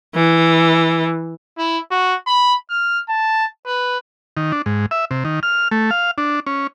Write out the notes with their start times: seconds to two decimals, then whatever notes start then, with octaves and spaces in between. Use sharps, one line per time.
0.15 E3
1.58 E4
1.91 F#4
2.27 B5
2.70 F6
3.09 A5
3.66 B4
4.37 D#3
4.52 D4
4.66 G#2
4.91 E5
5.11 C3
5.25 D#3
5.43 F6
5.71 A3
5.91 F5
6.18 D4
6.47 C#4